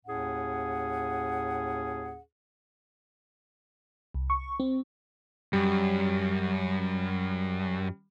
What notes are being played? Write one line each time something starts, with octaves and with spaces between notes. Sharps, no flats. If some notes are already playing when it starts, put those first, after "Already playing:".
D#2 A2 C#4 G#4 F#5
C2
C#6
C4
F#2 G3